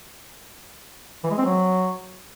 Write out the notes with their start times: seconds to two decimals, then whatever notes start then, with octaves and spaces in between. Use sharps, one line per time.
1.24 E3
1.31 G#3
1.38 C4
1.45 F#3